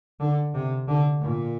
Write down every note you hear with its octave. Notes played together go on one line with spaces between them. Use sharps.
D3
C3
D3
A#2